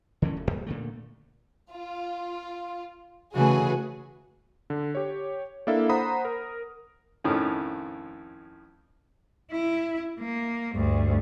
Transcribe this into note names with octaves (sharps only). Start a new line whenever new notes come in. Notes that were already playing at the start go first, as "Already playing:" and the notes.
D3 E3 A#3 C#4
D1
C2
A#2 D3 A3
F4
C#3 E3 A3 F#4 G#4 B4
D3
G4 C#5
A#3 D4 E4 A4 E5 F5
C5 F#5 A#5 B5 D#6
A#4
F2 A2 D#3 F3 C#4
E4
A#3
D2 G2